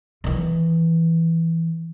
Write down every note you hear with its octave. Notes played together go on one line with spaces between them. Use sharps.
D#3 E3